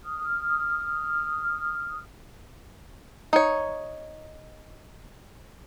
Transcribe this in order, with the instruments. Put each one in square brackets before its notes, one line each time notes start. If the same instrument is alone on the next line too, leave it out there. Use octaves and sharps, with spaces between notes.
[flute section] D#6 F6
[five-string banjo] D#4 C#5